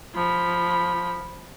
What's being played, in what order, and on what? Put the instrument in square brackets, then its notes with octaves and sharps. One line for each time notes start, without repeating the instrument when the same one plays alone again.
[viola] F3 B5